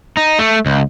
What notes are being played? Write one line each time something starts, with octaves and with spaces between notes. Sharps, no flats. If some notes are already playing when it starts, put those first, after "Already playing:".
D#4
A3
C#2